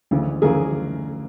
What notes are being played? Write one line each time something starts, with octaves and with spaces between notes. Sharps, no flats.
D2 C#3 E3
D2 C#3 E3 G#4 A#4